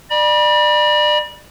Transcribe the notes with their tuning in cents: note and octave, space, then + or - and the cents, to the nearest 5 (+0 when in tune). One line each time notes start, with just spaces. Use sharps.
D5 +30 B5 -35